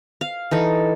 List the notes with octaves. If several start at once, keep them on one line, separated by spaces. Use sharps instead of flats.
F5
E3 D#4 A4